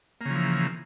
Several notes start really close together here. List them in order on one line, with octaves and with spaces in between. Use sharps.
A#3 C#3 F3 E3